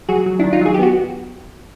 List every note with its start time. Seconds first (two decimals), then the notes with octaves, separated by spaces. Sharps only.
0.09 F#3 F#4 G#4
0.26 F#3
0.39 D#3 D4 E4
0.53 D#4 F4
0.61 F#3 G#4
0.74 G4
0.79 B3 F#4